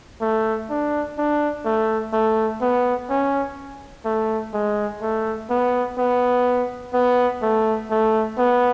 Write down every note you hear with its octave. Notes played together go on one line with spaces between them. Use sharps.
A3
D4
D4
A3
A3
B3
C#4
A3
G#3
A3
B3
B3
B3
A3
A3
B3